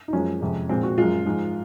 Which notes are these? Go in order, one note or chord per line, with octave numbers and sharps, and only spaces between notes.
D#4
F#2 F3 G#3 C#4
F2 C3 F3 G#3
A#2 F3 G#3 C4
F#4
F#2 F3 G#3 F4
G#2 F3 G#3